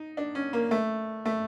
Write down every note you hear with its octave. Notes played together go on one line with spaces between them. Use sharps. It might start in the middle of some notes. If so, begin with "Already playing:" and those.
Already playing: D#4
D4
C#4
A#3
A3
A3